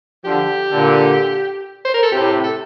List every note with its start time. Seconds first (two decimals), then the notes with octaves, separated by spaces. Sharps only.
0.25 D3 F3 G4
0.71 A#2 D3
1.85 C5
1.94 A#4
2.03 A4
2.12 A2 C3 G4
2.44 A4